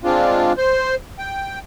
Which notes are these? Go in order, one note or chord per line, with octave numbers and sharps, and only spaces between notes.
G#3 C4 D4 F4
C5
G5